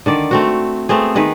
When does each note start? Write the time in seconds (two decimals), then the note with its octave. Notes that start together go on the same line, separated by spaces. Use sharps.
0.06 D3 D#3 D5
0.31 A3 C4 F#4
0.89 A3 B3 C4 G#4
1.15 D#3 G#4 B4 D#5